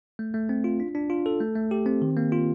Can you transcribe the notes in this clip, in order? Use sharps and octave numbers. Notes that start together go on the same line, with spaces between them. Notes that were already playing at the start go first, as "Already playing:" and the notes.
A3
A3
C4
F4
D4
D4
F4
A4
A3
A3
G4
C4
D#3
A#3
F4